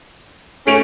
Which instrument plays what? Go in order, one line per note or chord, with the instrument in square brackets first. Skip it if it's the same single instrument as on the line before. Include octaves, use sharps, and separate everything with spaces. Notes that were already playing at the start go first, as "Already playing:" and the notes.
[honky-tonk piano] A3 D7 F7 [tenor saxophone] C#4